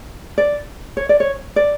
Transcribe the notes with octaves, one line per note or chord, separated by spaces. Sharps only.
D5
C#5
D5
C#5
D5